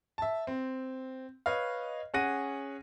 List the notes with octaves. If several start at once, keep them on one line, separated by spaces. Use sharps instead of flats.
E5 A5
C4
B4 C#5 D#5 F5
C#4 G#4 F#5 A#6 D#7